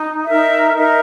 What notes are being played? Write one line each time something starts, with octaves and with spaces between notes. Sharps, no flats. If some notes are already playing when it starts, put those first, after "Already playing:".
Already playing: D#4
D#4 A#4 E5
D#4 A#4 E5